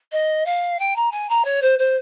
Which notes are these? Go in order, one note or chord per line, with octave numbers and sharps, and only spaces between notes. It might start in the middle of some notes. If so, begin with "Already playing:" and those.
D#5
F5
G5
A#5
G#5
A#5
C#5
C5
C5